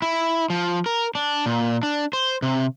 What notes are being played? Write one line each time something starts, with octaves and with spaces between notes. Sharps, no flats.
E4
F3
A#4
D4
A#2
D4
C5
C3